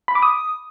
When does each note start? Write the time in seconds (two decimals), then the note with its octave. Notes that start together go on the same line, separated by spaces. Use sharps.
0.08 B5
0.15 D6
0.22 D#6